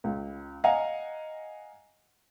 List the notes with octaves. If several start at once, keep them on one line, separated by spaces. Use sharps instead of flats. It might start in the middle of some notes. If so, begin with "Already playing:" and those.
C#2
D#5 F5 F#5 G#5 A#5